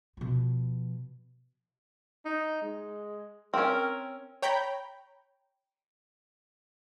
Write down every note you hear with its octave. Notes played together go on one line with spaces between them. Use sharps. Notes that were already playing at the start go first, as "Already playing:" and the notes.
B2 F3
D#4
G#3
C4 C#4 A#4
C#5 G5 A#5 B5 G6